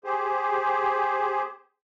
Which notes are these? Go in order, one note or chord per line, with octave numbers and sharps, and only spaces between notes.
G4 G#4 C5